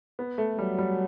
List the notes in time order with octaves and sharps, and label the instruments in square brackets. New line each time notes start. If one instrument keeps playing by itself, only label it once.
[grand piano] B3
A3
[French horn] F#3 [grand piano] G3
[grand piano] G3